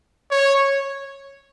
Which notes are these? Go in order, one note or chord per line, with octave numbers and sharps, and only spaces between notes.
C#5